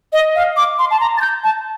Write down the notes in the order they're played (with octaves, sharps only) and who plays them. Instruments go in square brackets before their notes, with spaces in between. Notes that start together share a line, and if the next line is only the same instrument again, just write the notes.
[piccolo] D#5
F5
D6
C6
A5
A#5
A6
G6
A5